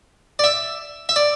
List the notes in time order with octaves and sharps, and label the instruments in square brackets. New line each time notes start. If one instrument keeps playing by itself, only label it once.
[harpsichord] D5
E5
E5
D5